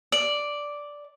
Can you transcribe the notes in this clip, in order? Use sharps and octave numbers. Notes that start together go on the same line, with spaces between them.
D5